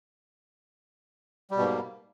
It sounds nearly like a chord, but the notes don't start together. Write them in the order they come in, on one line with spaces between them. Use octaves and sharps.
G3 B2 G#2 A#3